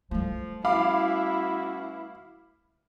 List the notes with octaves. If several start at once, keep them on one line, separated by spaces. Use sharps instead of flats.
F3 G3 A3
B3 C#4 E4 F#4 F5 B5 D6